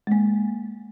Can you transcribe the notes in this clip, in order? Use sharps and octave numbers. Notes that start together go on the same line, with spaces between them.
G#3 A#3